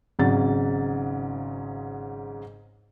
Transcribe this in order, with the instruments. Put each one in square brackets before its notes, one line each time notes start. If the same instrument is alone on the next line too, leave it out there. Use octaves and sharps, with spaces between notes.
[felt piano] G#1 G#2 C#3 F#3 A6